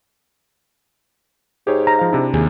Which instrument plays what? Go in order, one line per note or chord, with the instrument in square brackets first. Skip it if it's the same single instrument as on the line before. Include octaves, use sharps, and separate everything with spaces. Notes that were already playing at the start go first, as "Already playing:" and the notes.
[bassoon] G#2 [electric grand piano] G4 G#4 C#5
[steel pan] A#5
[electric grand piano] F3 F5
C3 D4 E4
[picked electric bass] D#2 [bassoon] G#4